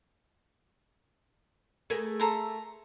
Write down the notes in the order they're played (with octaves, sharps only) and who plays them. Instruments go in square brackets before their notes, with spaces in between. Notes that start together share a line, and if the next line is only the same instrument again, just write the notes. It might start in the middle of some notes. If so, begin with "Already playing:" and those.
[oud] A3 G#4 A#4
[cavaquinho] A4 A#5 C6